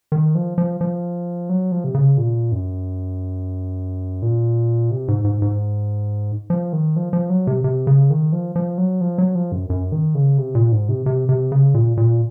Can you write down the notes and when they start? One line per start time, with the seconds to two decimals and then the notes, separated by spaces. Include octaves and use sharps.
0.12 D#3
0.35 F3
0.58 F3
0.81 F3
1.49 F#3
1.72 F3
1.84 C3
1.94 C#3
2.17 A#2
2.52 F#2
4.22 A#2
4.91 C3
5.08 G#2
5.25 G#2
5.42 G#2
6.50 F3
6.73 D#3
6.96 F3
7.13 F3
7.30 F#3
7.47 C3
7.64 C3
7.87 C#3
8.10 D#3
8.32 F3
8.56 F3
8.78 F#3
9.01 F3
9.18 F#3
9.35 F3
9.52 F#2
9.70 F#2
9.92 D#3
10.15 C#3
10.38 C3
10.55 A#2
10.72 G#2
10.89 C3
11.06 C3
11.29 C3
11.52 C#3
11.74 A#2
11.97 A#2